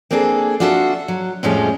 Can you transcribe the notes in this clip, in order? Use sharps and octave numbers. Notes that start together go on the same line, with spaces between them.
A#3 C4 D4 G#4 A4
D4 F4 F#4 A4 B4 E5
F#3
F2 A2 F3 G3 G#3 C#4